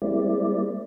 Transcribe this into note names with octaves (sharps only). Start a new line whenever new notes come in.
G3 G#3 A#3 C4 E4 D5